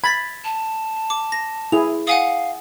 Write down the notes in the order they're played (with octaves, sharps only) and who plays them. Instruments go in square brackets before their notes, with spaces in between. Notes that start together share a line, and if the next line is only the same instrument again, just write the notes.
[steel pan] B5 [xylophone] G#6 A6 B6
[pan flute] A5
[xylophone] D6
A#6
[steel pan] E4 G#4 [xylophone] F7
[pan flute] F5 [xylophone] F#5 G#5 D#6